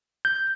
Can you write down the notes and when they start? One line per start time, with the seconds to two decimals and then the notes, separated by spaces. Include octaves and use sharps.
0.25 G6